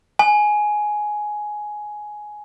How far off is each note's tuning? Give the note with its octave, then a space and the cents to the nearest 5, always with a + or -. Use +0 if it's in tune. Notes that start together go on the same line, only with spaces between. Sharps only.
G#5 +10